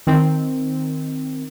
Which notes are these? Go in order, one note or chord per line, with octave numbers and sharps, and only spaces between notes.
D#3 C4